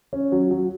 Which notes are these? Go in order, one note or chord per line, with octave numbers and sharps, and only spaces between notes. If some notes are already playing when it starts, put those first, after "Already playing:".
C#4
F#3
F#3